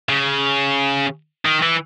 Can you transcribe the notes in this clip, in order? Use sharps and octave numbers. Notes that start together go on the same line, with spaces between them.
C#3
D#3
E3